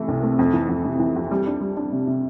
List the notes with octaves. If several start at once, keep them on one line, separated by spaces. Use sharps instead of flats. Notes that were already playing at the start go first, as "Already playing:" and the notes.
Already playing: C3 E3 A3
C2
A3
F2
E3
F2
C3
E3
F2
G3
D4
G3
D4
C3
C3